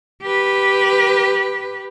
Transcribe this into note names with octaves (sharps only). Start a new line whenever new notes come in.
G4 B4